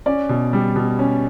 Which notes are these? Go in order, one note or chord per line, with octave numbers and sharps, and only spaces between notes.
C#4 D5
B2
G3
B2
C#4